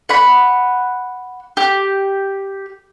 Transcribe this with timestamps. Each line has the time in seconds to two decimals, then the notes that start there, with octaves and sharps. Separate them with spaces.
0.09 F#5 B5
1.57 G4